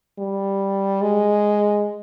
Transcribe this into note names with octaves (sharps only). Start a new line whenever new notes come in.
G3
G#3